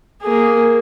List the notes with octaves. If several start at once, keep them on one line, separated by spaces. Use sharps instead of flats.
A#3 G#4